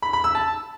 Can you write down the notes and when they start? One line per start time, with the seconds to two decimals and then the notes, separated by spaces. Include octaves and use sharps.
0.02 B5
0.13 B5
0.24 E6
0.35 A5